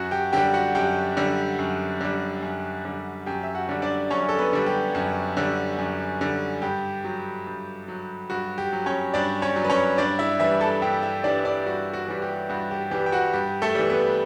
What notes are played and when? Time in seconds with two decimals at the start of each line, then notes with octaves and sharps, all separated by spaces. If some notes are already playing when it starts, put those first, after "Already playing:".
Already playing: F#2 F#4 F#5
0.11 G4 G5
0.33 D3 G3 G4 G5
0.53 F#4 F#5
0.75 F#2 G4 G5
1.17 D3 G3
1.59 F#2
2.01 D3 G3
2.42 F#2
2.85 D3 G3
3.26 F#2 G4 G5
3.43 E5
3.55 F#4 F#5
3.69 D3 G3
3.82 D4 D5
4.10 F#2 C#4 C#5
4.29 A4
4.38 B3 B4
4.53 D3 G3
4.66 G4
4.95 F#2
5.37 D3 G3
5.78 F#2
6.21 D3 G3
6.62 G2 G4
7.04 F#3
7.47 G2
7.88 F#3
8.30 G2 F#4
8.58 G4
8.73 F#3
8.86 C#4 C#5
9.14 G2 D4 D5
9.42 C#4 C#5
9.56 F#3
9.65 B4
9.70 C#4 C#5
9.98 G2 D4 D5
10.19 E4 E5
10.40 E3 G3 E4 E5
10.61 A4 A5
10.82 G2 G4 G5
11.02 E4 E5
11.23 E3 G3 D4 D5
11.45 D4 D5
11.66 G2 F#4
11.93 F#4
12.08 E3 G3
12.22 G4
12.49 G2 F#4
12.71 G4
12.91 E3 G3 G4
13.06 G5
13.12 F#4 F#5
13.33 G2 G4
13.62 A3 A4
13.75 E3 G3
13.90 B3 B4